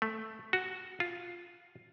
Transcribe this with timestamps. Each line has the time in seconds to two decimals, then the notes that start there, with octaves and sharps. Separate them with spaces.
0.02 A3
0.53 F#4
1.00 F4